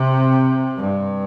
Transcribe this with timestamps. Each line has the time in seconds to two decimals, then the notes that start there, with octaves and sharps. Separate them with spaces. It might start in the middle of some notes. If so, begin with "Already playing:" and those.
Already playing: C3
0.77 G2